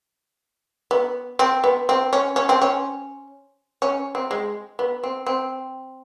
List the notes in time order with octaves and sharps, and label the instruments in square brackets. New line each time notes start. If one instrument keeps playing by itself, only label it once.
[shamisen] B3
C4
B3
C4
C#4
C#4
C4
C#4
C#4
C4
G#3
B3
C4
C4